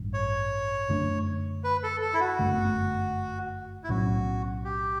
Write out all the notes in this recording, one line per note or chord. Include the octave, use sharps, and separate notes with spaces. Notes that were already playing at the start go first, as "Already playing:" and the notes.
Already playing: A1 G2
C#5
F#2 D3 A3 D4
B4
A4
A4
E4
F#4
G1 F#2 D3 A3
E4
B1 A2 F#3 C#4 F#4
G4